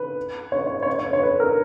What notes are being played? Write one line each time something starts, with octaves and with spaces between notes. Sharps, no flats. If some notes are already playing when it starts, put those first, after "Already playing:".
Already playing: B4
C#5
C#5
C#5
C#5
C#5
B4
A#4